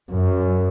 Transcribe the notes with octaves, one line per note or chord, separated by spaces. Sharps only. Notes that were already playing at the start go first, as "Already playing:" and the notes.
F#2